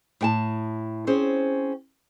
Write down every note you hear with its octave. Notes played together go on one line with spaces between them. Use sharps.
A2 G5 A5
C4 C#4 G#4 C5 C#5